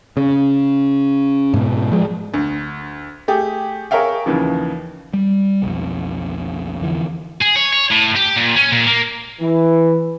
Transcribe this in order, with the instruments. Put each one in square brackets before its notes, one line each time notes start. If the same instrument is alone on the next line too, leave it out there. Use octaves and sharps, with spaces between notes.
[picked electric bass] C#3
G#2 B2
F3 G#3
[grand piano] D2
A3 G4 G#4
G#4 A#4 C#5 E5 F5 G5
D#2 C#3 E3 F3
[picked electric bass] G3
B1 F2
F2 D3 E3
[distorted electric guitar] G#4
C#5
C#5
A2
G4
A#2
C#4
A#2
A#3
[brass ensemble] E3